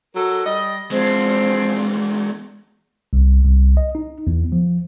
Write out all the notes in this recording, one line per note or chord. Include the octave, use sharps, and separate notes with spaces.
F#3 A4 A#4
G3 D#5
E2 F3 G#3 C4
C2
C2
D#5
D#4
E2
F3